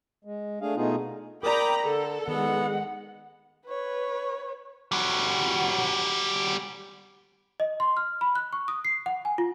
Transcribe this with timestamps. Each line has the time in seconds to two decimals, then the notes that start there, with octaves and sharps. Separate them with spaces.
0.25 G#3
0.61 A3 D4 G#4 F5
0.76 B2 A3 B3 D#4 F4 G#4
1.43 A#4 D5 G5 A#5 B5 D6 D#6
1.84 D3 A4
2.28 D#3 G#3 B3 F#5
3.68 B4 C#5
4.92 G3 F#4
7.60 D#5
7.80 C6
7.97 F6
8.21 B5
8.35 F#6
8.53 C#6
8.68 D#6
8.85 C7
9.06 F#5
9.25 G#5
9.38 F4